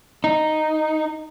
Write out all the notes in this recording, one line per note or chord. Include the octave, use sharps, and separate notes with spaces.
D#4